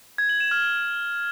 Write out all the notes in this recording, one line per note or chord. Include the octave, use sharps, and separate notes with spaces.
G#6
F#7
E7
F6